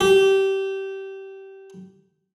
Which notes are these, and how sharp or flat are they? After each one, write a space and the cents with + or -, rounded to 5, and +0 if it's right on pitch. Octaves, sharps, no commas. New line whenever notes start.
G4 -20